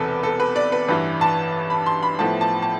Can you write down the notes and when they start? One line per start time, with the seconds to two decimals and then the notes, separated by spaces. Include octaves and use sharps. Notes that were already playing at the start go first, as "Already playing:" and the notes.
Already playing: E1 E2 C3 A4 B4
0.23 A4
0.40 B4
0.56 D5
0.72 B4
0.88 A1 G2 E3 B4
1.21 A5
1.70 B5
1.86 C6
2.03 B5
2.19 A1 A2 F3 B3 E4 A5
2.41 A5
2.62 A5